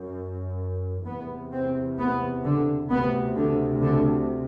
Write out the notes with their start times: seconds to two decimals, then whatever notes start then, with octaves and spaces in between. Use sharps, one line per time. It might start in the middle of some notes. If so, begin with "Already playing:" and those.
Already playing: F#2
1.06 E2 C3 B3
1.52 C4
1.98 B3
2.43 D3
2.90 D2 C3 B3
3.35 D3
3.81 D3